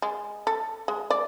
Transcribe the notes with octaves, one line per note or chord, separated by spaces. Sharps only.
G#3
A4
G#3
D5